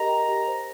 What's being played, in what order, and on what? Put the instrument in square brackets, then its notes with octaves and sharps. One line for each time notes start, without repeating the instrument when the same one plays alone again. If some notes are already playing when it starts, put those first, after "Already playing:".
Already playing: [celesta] G4 A#4 D#5 [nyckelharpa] A#5
[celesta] G5
G4
C5